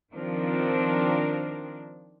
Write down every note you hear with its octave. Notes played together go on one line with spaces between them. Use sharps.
D#3 F3 C4 D4 A#4